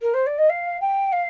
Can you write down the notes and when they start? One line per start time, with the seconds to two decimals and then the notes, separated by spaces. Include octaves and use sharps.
0.01 A#4
0.14 C5
0.26 D5
0.38 D#5
0.49 F5
0.81 G5
1.12 F5